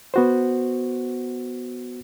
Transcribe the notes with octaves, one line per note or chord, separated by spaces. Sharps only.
B3 F#4 C5